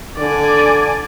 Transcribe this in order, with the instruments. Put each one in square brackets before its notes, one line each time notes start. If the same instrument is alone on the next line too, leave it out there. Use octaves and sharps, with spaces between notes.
[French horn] D3 [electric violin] D5 G#5